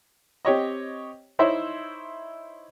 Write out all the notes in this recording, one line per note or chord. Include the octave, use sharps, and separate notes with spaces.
C4 G4 C#5 D#5
D#4 E4 C5 C#5 E5